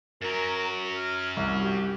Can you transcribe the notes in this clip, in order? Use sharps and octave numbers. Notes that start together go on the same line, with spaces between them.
F#2 F#3 A#4
F6
C2
G4